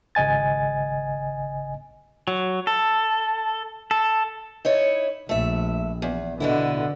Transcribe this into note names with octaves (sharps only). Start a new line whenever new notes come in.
G#1 C#3 D#5 G#5 A6
F#3
A4
A4
D#4 E4 C#5
A#1 A3 E5
E2
B2 D3 B3 E4